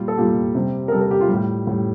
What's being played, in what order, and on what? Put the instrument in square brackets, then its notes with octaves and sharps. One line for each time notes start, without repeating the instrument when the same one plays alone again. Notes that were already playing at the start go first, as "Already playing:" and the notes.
Already playing: [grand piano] A#2 G3 F4
A4
A#2 G3 G4
C3 G3
A#4
C3 G3 A4
A#4
G4
F4
A2 G3
A2 G3